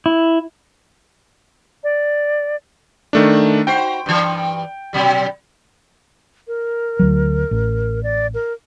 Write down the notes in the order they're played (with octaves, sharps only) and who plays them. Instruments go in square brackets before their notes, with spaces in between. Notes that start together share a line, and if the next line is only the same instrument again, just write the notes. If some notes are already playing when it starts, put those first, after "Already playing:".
[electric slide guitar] E4
[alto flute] D5
[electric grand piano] D#3 A3 D4
[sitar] D#4 F#4 C5 [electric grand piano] G5
[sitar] G2 E3
B2 F#3 G3
[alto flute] A#4
[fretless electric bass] D2 F#3
A1
[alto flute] D5
A#4